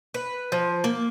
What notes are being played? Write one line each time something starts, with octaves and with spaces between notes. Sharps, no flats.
B4
F3
A#3